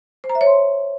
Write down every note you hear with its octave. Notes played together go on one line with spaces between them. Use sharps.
C5
A#5
E5
C#5
C6